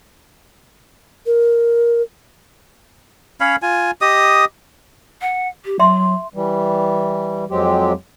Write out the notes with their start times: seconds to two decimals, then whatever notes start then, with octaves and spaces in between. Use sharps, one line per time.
1.26 A#4
3.40 C#4 C#5 F5 B5
3.62 F4 G#5
4.01 G4 D#5 D#6
5.21 F#5
5.65 G4
5.79 F#3 E5 C6
6.34 E3 G3
7.50 F2 F#3 G#3 C4 G4